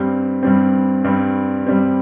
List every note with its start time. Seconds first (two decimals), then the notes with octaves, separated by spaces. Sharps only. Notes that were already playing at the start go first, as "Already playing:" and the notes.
Already playing: G2 G3 C4
0.43 G2 G3 C4
1.04 G2 G3 C4
1.67 G2 G3 C4